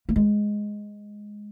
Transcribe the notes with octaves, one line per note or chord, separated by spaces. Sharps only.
A#3
G#3